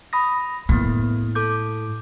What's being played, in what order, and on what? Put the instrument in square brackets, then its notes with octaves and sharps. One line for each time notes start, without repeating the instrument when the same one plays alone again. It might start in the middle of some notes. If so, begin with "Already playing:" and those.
[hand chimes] B5 D#6 A#6
[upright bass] A2 [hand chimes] A#3 B3
[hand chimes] A4 D6 G6